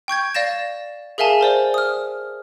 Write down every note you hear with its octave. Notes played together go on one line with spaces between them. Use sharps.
G5 C#6 G6 G#6
D5 F5 A6 A#6 E7
G#4 A#4 E5 F5 G#5 A5
A#4 C5 D5
D#6 F6